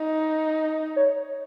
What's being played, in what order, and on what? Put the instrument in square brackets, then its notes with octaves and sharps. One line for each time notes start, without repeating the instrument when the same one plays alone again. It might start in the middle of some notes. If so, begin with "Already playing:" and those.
Already playing: [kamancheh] D#4
[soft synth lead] C#5